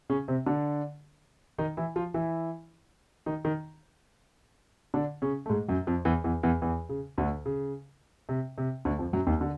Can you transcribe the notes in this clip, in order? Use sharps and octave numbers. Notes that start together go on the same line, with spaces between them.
C#3 C#4
C3 C4
D3 D4
D#3 D#4
E3 E4
F3 F4
E3 E4
D#3 D#4
D#3 D#4
D3 D4
C#3 C#4
A3
G#2 G#3
F#2 F#3
F2 F3
E2 E3
E2 E3
E2 E3
E2 E3
C#3
D2 D3
C#3
C3
C3
D2 D3
F2 F3
F#2 F#3
D#2 D#3
D3